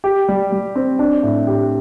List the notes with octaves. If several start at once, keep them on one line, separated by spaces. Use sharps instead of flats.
G4
G3
G3
C4
D4
A2
G4